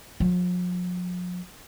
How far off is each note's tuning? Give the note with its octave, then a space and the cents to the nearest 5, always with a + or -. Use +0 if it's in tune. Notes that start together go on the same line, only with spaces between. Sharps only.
F3 +45